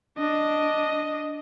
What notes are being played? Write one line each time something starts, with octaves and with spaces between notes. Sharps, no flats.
D4 D#5